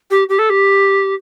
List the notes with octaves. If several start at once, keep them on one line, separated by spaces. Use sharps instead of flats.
G4
G4
A4
G4